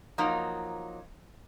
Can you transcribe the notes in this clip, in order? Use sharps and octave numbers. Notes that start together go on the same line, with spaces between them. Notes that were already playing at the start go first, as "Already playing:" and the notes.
F3 F#3 A#3 D#4